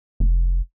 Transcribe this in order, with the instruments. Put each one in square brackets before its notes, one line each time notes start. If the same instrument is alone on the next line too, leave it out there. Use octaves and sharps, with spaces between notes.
[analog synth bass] F1